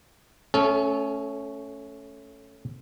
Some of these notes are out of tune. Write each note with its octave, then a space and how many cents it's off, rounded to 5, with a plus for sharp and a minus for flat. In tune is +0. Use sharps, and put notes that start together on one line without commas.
A3 +0 C#4 +0 A4 -35